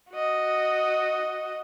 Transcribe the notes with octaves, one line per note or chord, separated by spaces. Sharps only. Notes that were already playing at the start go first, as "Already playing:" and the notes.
F#4 D#5